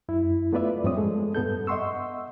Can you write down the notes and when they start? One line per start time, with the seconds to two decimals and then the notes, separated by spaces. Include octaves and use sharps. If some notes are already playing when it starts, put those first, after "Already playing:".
0.09 F#2 E4
0.53 A3 B3 F4 B4 D5 E5
0.84 G2 F3 C4 C#5 D#6
0.97 G#3 A4
1.35 G2 B3 A4 G6
1.67 D#5 E5 F#5 C6 C#6 E6